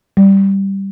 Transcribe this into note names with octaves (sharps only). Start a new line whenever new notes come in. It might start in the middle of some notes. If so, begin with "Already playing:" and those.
G3